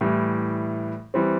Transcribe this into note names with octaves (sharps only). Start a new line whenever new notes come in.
A2 E3 G3
E3 G3 C4